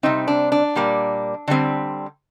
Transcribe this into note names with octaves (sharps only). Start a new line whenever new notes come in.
C3 G3 C4 D#4
D4
D4
A#2 G3 A#3
D3 G3 C4